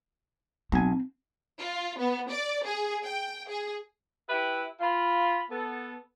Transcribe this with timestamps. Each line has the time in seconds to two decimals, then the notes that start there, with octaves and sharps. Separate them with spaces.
0.72 B1 C4 G#5
1.60 F4
1.99 B3
2.30 D5
2.65 G#4
3.05 G5
3.49 G#4
4.30 E4 G4 B4 E5
4.80 F4 B5
5.51 B3 A4